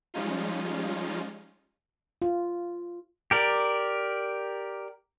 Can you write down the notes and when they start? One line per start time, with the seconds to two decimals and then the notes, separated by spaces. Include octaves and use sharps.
0.14 F3 G3 G#3 C#4 D#4 F4
2.22 F4
3.31 G4 A#4 D5